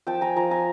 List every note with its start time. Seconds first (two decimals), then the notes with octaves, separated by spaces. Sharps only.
0.07 F3 G5 A5
0.21 G#5 A#5
0.36 F3 G#5 A#5
0.51 G#5 A#5